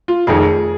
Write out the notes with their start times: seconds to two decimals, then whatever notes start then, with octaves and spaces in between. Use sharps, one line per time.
0.08 F4
0.27 F1 F2 D#3 G#4